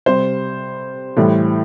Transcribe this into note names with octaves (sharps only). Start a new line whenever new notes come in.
C3 G3 C5
A2 E3 G3